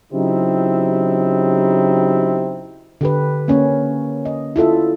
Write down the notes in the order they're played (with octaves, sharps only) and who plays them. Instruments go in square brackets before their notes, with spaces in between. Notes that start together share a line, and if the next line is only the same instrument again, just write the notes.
[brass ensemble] C#3 F#3 C4 D#4 E4 G4
[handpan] D3 G4 B4
A#3 C#4 C#5
D#5
E4 F4 A4 E5